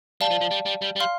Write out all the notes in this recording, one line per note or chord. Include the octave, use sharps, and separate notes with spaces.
G3 D5 F5 A5
F3
F3
G3
G3
G3
G3
F5 C6 F6